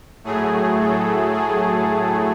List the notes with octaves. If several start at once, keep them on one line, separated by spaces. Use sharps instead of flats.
A2 F#3 A3 G#4
A4
G#4